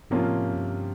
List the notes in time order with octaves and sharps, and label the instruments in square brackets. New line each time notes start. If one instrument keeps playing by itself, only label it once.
[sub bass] G#2 [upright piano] C3 F3 A#3 C#4 F4
[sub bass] A2
G#2
F#2
G2